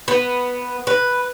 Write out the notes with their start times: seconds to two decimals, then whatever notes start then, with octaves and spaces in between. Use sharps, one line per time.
0.08 B3
0.87 B4